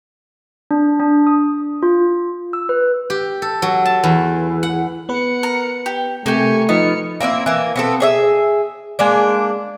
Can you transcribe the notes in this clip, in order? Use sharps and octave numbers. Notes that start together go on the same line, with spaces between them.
D4
D4
D#6
F4
E6
B4
G4
A4
F#3
A5
E2
F#5
B3 B4 F#5 C#7
A#4
G4
C3 A3 A#3 G4 G#5 C#6
F3 B3 D#4 D#5 F6 C#7
A#3 C4 D#4 E4
E3 A#3
B3 C4 A4
G#4 C#5 E5
G#3 A#3 D4